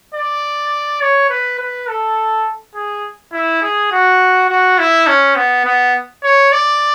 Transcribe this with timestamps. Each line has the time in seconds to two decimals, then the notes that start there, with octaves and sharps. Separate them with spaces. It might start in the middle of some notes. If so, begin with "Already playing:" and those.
0.14 D5
1.01 C#5
1.30 B4
1.59 B4
1.88 A4
2.75 G#4
3.32 E4
3.62 G#4
3.92 F#4
4.49 F#4
4.78 E4
5.07 C#4
5.36 B3
5.64 B3
6.23 C#5
6.52 D5